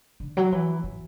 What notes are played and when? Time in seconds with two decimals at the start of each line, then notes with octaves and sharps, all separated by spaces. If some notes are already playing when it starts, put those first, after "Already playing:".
0.20 D3
0.37 F#3
0.52 E3
0.83 E3